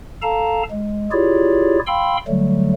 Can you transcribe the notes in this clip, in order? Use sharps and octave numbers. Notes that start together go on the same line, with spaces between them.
A4 F5 A5 A#5
G#3
E4 F4 G4 G#4 C#5 D5
F5 G5 B5 C6 E6
D3 F#3 G3 A3